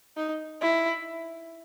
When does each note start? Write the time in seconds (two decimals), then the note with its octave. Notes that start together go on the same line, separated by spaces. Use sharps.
0.17 D#4
0.61 E4